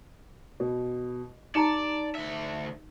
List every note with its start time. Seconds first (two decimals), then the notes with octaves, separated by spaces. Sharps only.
0.60 B2
1.55 D#4 G4 D5 A5 A#5 C#7 E7
2.15 D2 E5